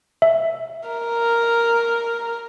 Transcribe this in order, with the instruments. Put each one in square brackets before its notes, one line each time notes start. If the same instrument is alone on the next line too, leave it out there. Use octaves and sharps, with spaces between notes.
[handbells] E5
[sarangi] A#4